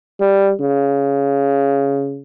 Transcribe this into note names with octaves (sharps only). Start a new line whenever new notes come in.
G3
C#3